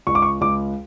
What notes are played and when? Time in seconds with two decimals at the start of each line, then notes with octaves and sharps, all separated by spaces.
0.07 C#2 C#6
0.15 D6
0.22 C#6
0.41 C#2 D6